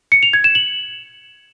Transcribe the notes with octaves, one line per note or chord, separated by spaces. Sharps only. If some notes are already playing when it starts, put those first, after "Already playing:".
C#7
F7
G#6
E7
F#7